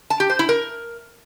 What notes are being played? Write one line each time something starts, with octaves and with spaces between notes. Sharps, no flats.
A5
G4
C5
E4
A#4